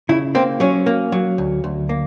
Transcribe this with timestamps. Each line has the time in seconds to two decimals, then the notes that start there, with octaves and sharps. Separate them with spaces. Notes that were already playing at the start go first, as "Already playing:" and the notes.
0.09 C#3 E4
0.35 A#3 C4
0.60 F#3 C#4
0.86 A#3
1.12 F#3
1.38 D2
1.64 D2
1.89 A#3